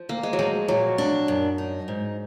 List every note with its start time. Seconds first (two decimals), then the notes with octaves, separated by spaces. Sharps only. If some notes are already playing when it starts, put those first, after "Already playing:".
Already playing: F3
0.09 D2 A#3
0.23 G#3
0.33 F#3
0.39 F3 G#3
0.68 A#2 F#3
0.98 D4
1.28 F#2
1.58 D#4
1.88 G#2